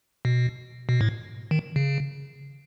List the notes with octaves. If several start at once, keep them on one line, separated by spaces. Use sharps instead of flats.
B2
B2
A2
D#3
C#3